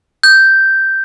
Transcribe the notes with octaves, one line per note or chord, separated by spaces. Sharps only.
G6